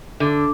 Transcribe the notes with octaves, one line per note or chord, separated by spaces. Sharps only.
D3